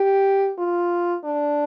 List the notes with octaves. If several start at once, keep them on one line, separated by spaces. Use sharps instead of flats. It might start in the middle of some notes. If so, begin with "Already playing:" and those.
Already playing: G4
F4
D4